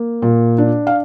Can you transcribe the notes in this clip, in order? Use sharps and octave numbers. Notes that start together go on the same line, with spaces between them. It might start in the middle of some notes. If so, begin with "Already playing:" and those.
Already playing: A#3
A#2
D4
F5